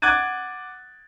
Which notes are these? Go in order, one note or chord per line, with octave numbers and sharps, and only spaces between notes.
F#5 D6 F#6 G#6 A6 D#7